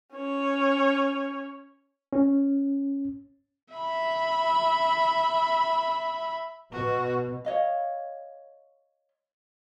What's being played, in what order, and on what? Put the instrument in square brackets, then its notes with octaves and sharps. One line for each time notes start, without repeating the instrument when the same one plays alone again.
[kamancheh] C#4 C#5
[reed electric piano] C#4
[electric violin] E5 B5
[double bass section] B2 [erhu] F#4
[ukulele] C#5 D#5 F5